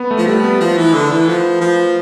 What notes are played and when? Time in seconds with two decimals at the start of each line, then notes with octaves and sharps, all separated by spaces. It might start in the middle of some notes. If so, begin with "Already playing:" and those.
Already playing: B3
0.11 A3
0.18 F3
0.27 G3 A3
0.44 B3
0.60 F3
0.77 E3
0.94 D3
1.11 E3
1.28 F3
1.61 F3